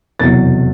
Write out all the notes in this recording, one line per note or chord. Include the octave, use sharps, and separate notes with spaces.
F1 E2 B2 F#3 A6